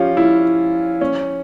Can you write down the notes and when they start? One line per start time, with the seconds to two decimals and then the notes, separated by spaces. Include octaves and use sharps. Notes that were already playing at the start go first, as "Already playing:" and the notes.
Already playing: F3 C#4 F4 G4
0.17 E4
1.01 C#4